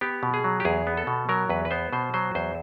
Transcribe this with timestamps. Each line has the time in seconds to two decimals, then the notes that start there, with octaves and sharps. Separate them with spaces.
0.01 B3 G4
0.23 B2
0.34 G#4
0.44 F#3
0.60 G4
0.65 E2 G#4
0.87 B3
0.97 A4
1.07 B2
1.29 F#3 A#4
1.49 E2 B4
1.65 B4
1.71 B3 C5
1.93 B2 C5
2.14 F#3 C5
2.35 E2 C5